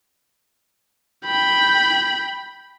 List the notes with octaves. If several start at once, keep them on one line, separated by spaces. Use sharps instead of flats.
G5 B5